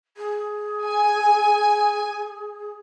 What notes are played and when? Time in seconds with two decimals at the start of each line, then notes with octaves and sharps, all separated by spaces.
0.17 G#4
0.84 G#5